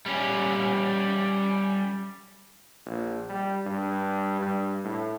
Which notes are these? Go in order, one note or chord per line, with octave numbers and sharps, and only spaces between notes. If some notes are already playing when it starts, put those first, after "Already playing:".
G3 C#4
A#1
G3
G2
G2
A2